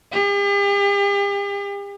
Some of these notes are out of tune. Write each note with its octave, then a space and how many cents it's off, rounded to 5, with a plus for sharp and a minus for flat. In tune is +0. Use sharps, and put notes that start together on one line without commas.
G4 +45